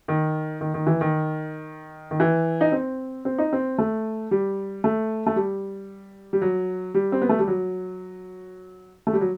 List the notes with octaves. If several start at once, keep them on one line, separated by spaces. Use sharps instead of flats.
D#3
D#3
D#3
E3
D#3
D#3
E3
D#4
C4
C4
D#4
C4
A3
G3
A3
A3
G3
G3
F#3
G3
C4
B3
A3
G3
F#3
A3
G3
F#3